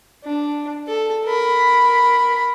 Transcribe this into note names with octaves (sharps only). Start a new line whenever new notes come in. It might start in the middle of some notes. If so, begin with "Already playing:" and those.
D4
A4
A#4 B5